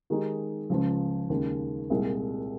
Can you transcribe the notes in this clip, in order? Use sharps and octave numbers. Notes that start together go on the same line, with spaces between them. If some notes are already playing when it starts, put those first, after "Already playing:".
D#3 G#3 D#4 G4
C#2 C#3 F3
D#2 C#3 G#3
C2 A#2 G#3